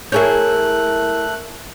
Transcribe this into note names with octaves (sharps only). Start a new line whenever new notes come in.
A3 E4 G#4 A#4 C#5 F#6 G6